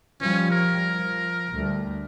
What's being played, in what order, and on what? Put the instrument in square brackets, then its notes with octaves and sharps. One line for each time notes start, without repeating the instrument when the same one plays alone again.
[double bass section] F3 G3 [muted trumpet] C#4
[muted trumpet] A#4
[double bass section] F3
D2 G3 A3